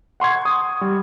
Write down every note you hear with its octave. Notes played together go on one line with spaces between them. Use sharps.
F#5 C6 C#6 G#6
D#6
G3